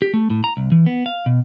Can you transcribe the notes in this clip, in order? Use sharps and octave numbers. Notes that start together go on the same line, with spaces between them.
G4
A3
A2
A#5
C2
E3
B3
F5
B2